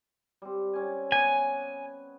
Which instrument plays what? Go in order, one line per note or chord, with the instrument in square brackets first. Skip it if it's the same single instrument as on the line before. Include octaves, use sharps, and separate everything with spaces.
[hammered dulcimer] G3 C4
C4 C#4 G#5
[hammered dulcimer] B3 C#4 D6 [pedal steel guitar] G#5